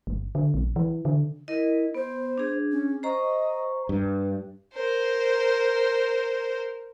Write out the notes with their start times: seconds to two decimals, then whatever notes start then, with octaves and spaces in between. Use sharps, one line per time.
0.07 G1
0.35 D3
0.54 A#1
0.76 E3
1.05 D3
1.48 E4 A#4 D#5
1.94 B3 C5
2.38 D4 G#4
2.71 C#4
3.03 C5 D#5 A#5 C#6
3.89 G2
4.74 A#4 C5